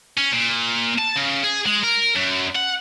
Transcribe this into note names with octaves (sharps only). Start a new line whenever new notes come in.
C#4
A#2
A5
C#3
G#4
G#3
A#4
F#2
F#5